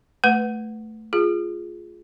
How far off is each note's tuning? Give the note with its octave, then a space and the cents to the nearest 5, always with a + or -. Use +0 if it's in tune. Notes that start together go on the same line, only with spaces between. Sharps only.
A3 +0 B4 +0 F#5 +0
F4 +0 G#4 +0